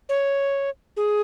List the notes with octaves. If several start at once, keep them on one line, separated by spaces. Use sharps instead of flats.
C#5
G#4